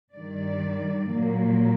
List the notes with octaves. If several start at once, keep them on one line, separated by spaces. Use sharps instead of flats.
G2 D#3 G3 D5
A#2 F#3 A#3